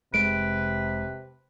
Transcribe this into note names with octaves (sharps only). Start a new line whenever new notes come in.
F1 C3 G#3 B4 D7